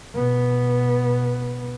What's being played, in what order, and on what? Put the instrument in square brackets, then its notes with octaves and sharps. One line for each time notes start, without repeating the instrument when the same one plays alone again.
[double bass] B2 B3